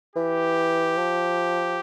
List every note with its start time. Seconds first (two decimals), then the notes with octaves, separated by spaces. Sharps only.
0.16 E3 G4
0.98 F3